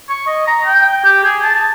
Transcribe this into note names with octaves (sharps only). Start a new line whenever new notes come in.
C#6
D#5
A#5
G5
G4
G#4
A5